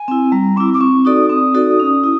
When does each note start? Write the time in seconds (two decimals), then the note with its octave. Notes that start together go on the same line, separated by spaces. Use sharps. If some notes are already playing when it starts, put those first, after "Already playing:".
Already playing: G#5
0.08 C4 E4
0.32 G3 A#5
0.57 C4 E4 D6
0.73 D6
0.81 C4 C#6
1.05 D#4 F#4 A4 D5 D#6
1.30 C4 D#6
1.54 D#4 F#4 A4 D5
1.80 C#4
2.04 E4